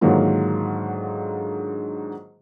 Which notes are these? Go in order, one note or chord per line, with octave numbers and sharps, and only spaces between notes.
G#2 D3 D#3 F#3 A#3 F4